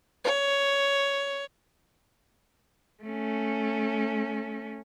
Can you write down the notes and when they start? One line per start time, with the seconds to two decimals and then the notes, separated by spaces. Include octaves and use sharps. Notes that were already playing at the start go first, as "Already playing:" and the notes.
0.25 C#5
3.03 A3 C#4